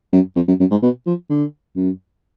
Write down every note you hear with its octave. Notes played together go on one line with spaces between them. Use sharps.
F#2
F2
F#2
F#2
G#2
B2
F3
D3
F#2